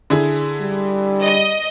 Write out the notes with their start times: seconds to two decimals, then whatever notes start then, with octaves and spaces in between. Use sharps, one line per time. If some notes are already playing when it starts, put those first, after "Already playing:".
0.10 D3 E4 G#4
0.61 G3
1.23 D#5